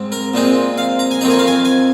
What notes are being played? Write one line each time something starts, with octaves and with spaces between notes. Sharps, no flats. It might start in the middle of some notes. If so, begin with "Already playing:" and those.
Already playing: G#2 G#3 C4
A#4
A#2 G#3 C4 D#4
F5
A#5
G#5
F2 D#3 C4 D#4 A#5
G#5
F5
G#5
G#5